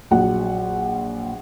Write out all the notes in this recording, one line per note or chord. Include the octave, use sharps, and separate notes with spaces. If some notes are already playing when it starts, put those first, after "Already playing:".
A#1 F#3 F#5